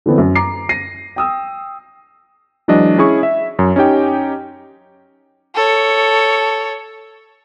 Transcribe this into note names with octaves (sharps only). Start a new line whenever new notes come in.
D3 E3 B3 C4 D4
F#2
A#5 D6 C7
A#6 C7 D#7
G5 D#6 E6
E3 F#3 G#3 D4 D#5
C#4 E4 G#4 C#6
E5
F#2
C#4 D#4 G4 G5
A4 C#5